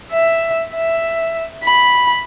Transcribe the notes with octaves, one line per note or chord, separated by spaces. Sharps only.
E5
E5
B5